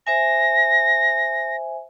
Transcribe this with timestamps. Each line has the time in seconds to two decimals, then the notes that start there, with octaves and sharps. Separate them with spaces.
0.07 C5 E5 G#5 A#6